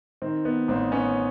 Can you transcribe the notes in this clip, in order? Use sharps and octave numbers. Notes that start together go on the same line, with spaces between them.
D#3 C4
B3
A1 C4
B3 C#4